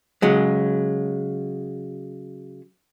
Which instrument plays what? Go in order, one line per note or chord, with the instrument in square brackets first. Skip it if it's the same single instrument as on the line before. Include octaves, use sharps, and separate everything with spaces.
[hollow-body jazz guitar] C#3 F#3 G#3